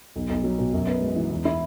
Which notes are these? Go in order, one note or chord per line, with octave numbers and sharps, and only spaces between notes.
B1
B1
F#3
B2
F#2
B3
G#3
E3
E2
E4